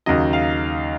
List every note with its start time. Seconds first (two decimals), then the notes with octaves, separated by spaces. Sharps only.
0.06 D#2 C#3 F#3 D#5
0.33 F5